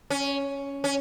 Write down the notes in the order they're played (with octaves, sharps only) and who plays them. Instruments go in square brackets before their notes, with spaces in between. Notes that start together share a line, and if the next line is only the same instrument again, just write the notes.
[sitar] C#4
C#4